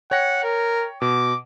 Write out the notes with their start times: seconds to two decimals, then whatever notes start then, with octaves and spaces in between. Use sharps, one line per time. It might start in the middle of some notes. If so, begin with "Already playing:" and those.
0.11 C#5 F#5 G5 A#6
0.44 A#4
1.02 B2 D6